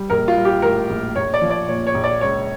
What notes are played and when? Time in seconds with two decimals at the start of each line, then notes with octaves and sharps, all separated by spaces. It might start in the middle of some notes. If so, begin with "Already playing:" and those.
Already playing: G3
0.10 A#1 A#4
0.28 F4
0.37 G3
0.45 G4
0.62 A2 A#4
0.90 A#1
1.16 A#1 C#5
1.34 D5
1.42 F3
1.50 D5
1.68 A#2 C#5
1.87 C#5
1.94 A#1
2.04 D5
2.21 C#2 C#5